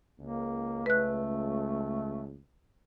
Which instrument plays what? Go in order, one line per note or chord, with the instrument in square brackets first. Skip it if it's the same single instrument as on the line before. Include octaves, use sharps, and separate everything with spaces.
[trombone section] C#2 [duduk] A#3
[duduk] A3 [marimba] B4 F#6